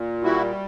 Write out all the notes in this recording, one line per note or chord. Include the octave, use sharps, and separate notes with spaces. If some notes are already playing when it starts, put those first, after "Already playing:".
Already playing: A#2
G3 E4 F#4